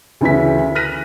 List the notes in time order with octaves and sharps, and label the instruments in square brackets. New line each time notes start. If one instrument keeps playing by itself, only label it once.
[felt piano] D2 C#3 E3 E5 B6
F6 F#6 A#6 B6 D#7